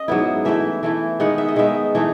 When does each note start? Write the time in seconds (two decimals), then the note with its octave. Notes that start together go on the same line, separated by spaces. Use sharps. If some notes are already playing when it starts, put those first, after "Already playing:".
Already playing: C#4 D#5
0.08 G#2 F#3 B3 E4
0.45 E3 A3 E4 E5
0.83 E3 A3 E4
1.20 D#3 G#3 B3 D#4 F#5
1.38 E5
1.48 D#5
1.56 D#3 G#3 B3 D#4 E5
1.95 E3 A3 D#4